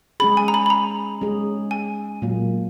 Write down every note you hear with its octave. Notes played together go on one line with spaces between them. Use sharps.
G#3 C#4 G#4 B5
G#5
A#5
B5
B5
A#5
G#3 C#4 G#4
G#5
A#2 F#3 A#3